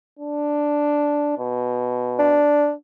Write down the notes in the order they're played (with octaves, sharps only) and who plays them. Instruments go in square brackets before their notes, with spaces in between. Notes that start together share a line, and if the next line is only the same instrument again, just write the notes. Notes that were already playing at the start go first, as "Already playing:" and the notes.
[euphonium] D4
B2
[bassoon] D4